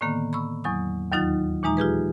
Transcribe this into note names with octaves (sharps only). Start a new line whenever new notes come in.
A2 D3 D#3 A#3 B3
B5 C#6 E6
E2 F#3 C#6 D#6
D#2 D#3 F#3 D#4 F4 A6
A#2 E3 G#3 D#4 A#5
F4 G4 G#4 B4